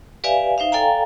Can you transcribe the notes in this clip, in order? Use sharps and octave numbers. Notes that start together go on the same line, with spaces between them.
G4 B4 D5 E5 F5 G#5
D#4 C5 E5 F5
A4 D5 F5 G5 G#5 A#5